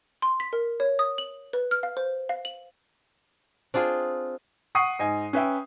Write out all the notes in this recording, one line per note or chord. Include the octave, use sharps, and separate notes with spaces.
C6
B6
A#4
C#5
D#6
F#7
B4
F6
F5
C5
F5
F#7
C4 D4 F4 G#4
F#5 C#6 D#6 C7 D#7
G#2 D#5 G#5
C#4 B4 E5 G5